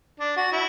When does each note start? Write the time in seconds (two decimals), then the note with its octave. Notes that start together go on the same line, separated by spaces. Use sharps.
0.20 D4
0.37 F#4
0.52 E4